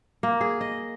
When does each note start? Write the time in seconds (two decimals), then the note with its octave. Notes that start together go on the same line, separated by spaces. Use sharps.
0.23 A#3
0.41 G#4
0.61 D#5